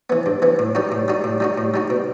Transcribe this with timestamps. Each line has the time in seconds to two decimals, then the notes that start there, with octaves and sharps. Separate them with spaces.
0.10 E3 B3
0.26 G2
0.42 E3 B3
0.59 A2
0.75 G3 D#4 F#4
0.92 A2
1.08 G3 D#4 F#4
1.24 A2
1.40 G3 D#4 F#4
1.58 A2
1.74 G3 D#4 F#4
1.90 B2